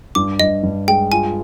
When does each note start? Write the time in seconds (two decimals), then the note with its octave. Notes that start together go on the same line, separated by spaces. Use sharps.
0.15 G2 D6
0.40 G2 D#5
0.63 G2
0.88 G#3 G5
1.12 F4 G#5